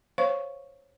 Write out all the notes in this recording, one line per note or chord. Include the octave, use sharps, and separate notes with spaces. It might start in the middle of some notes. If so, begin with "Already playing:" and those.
C5 C#5 F5 C#6